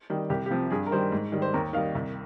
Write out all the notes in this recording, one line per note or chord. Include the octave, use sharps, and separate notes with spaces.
D#3 G3
C2 G4
G4
C3 F3
G2 G#4
A#4
D#3 G3 C5
G#2
D#3 G3
C5
D#2 A#4
D#3 G3 F5
C2